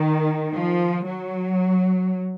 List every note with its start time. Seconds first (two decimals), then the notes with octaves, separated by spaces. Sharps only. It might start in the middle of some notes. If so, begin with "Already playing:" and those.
Already playing: D#3
0.54 F3
1.07 F#3